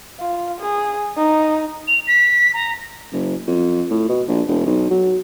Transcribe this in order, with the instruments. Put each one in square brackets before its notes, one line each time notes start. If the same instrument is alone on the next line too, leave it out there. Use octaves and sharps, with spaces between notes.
[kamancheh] F4
G#4
D#4
[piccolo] F7
B6
A#5
[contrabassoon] F#1
F2
A2
B2
A#1
E1
B1
F#3